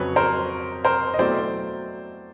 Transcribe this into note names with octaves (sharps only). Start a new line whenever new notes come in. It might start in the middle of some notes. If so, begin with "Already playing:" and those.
Already playing: F2 C#3 F#3 B4 C#5
A#4 C5
A#4 C5
D#5
B2 F#3 A3 C4 E4 C5 D5